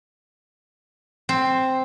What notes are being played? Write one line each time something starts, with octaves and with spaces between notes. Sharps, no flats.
C4